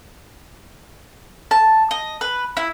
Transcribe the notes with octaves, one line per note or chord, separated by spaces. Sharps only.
A5
D#5
B4
E4